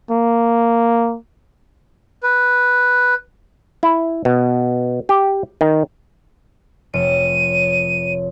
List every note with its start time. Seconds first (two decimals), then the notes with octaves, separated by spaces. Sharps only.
0.11 A#3
2.23 B4
3.83 E4
4.25 B2
5.09 G4
5.61 D#3
6.94 F1 C#5 D#7